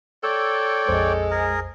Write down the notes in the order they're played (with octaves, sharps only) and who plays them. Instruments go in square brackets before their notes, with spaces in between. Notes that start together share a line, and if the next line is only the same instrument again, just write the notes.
[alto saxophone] A4 [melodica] C#5 D5 G5 [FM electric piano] E6
[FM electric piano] A#1 F2 C5 [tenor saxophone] G#3
[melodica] G#4 A#4